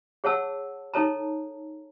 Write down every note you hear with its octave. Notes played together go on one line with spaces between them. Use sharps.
G#4 C#5 F#5 A5 E6
D#4 A4 C#5 A5 A#5